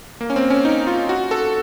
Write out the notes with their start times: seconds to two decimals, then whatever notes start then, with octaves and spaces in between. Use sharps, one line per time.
0.21 A#3
0.30 C#4
0.36 C4
0.50 C#4
0.65 D#4
0.87 F4
1.09 F#4
1.31 A4